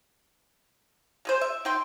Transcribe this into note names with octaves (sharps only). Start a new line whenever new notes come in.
G#3 G#4 C5
E5
D#4 G5 C6